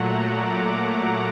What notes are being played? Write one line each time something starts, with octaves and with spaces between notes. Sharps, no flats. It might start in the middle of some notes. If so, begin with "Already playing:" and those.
Already playing: A#2 F#3 A3 F#5 A#5
D6
F#5